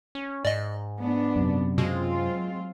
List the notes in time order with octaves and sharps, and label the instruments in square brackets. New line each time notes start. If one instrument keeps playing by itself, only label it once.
[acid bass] C#4
[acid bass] G#2 [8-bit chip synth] D5 D#5
[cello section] B3 D4
[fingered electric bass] F#2 C3
[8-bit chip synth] B2 [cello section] F#3 C4 F4 [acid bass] G#3